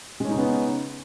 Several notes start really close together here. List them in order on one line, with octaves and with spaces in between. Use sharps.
G#3 C#4 D#4 C#3 B3